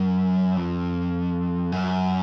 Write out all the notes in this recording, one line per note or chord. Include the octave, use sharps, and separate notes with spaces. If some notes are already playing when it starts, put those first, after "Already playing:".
Already playing: F#2
F2
F#2